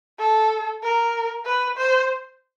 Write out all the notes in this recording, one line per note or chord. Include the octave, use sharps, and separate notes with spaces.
A4
A#4
B4
C5